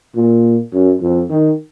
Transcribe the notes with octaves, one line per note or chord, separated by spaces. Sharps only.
A#2
F#2
F2
D#3